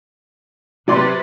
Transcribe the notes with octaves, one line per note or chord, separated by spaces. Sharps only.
C3 F#3 B4 D5 C6